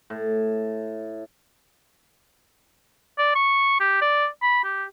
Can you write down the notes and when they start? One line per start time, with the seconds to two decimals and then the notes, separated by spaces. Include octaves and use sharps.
0.10 A2
3.18 D5
3.35 C#6
3.80 G4
4.02 D5
4.42 B5
4.64 G4